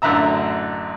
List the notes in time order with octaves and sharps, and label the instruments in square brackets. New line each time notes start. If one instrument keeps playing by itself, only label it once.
[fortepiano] A1 F#2 D3 E5 A#5 E6